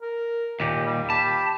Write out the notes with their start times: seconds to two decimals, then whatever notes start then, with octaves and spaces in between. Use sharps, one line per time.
0.02 A#4
0.60 D#2 A#2 G4
0.85 G3
1.10 G4 A5 B5